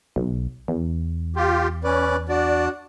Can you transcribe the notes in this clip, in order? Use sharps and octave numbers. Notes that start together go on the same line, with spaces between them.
B1
E2
F4 G4
C#4 B4 D5
D4 F#4 D5